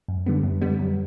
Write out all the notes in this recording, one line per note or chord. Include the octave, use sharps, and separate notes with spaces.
F#2
D3 G3 B3
F#2
D3 G3 B3
F#2